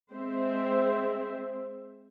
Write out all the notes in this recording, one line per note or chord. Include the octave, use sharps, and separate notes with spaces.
G#3 C4 C5 E5